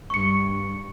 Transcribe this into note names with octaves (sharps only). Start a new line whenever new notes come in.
G2 C#6 C#7